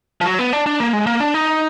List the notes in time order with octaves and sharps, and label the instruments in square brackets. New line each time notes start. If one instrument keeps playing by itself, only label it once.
[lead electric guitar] F3
F#3
B3
D4
D4
A#3
G#3
A#3
D4
D#4